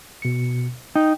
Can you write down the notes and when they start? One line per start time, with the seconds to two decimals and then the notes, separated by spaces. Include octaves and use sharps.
0.22 B2 C#7
0.96 D#4 G5